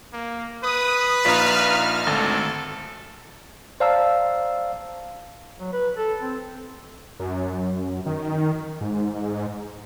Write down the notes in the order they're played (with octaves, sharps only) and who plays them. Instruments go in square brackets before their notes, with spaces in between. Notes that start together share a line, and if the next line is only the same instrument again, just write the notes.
[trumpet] A#3
[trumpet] B4 [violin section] D#6
[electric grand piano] A#1 F4 B6 [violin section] D#4 F6
[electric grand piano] G#1 D2 [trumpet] A4
[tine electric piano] C5 D5 F5 A5 A#5 E6
[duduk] F#3
B4
A4
C4
[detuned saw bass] F#2
D#3
G#2